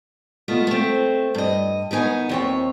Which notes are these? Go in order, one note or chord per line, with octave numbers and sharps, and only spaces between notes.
A3 B3 F4 D#5
A3 C4
G2 D#5
D#3 B3 D#4 G#5
D#2 C4 C#5